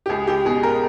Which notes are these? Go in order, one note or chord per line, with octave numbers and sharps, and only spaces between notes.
G4
C#2 G#4
C#2 G4
B2 G#4
G#3 A#4